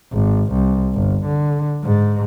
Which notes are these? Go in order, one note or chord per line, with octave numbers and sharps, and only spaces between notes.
G#1
C2
G1
D3
G#2